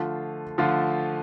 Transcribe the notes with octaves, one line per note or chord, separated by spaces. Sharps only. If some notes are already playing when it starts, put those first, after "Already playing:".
Already playing: D3 F3 A3 F4
D3 F3 A3 F4